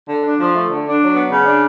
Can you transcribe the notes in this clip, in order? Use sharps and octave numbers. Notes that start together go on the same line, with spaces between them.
D3
D4
F3
A3
D3
D4
F#3
B3
C#3
D4